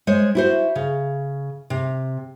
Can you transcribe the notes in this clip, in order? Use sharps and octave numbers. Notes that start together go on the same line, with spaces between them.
G#3 C5 C#5
E4 F#4 C5
C#3
C3